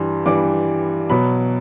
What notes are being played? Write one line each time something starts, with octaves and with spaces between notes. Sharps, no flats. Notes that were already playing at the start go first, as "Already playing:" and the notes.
Already playing: G2 E3 G3 C6
G2 E3 G3 D6
B2 F#3 B5